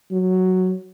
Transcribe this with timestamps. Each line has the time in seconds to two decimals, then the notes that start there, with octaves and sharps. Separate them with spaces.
0.11 F#3